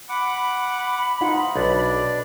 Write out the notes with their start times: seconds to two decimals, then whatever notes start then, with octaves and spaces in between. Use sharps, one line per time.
0.09 F#5 B5 D6
1.21 D#4 F4 F#5
1.56 B1 D4 D5